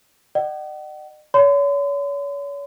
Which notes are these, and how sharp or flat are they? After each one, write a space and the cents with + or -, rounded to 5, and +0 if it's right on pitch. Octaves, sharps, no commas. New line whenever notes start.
D#5 -45 F#5 +40
C#5 +35 C6 -45